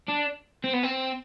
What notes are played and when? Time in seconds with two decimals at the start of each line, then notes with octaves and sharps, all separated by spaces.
0.08 D4
0.64 C4
0.73 B3
0.83 C4